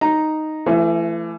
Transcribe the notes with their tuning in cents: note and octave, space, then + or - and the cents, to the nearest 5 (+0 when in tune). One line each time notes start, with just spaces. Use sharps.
D#4 +0 A#5 +0
E3 +30 A3 +0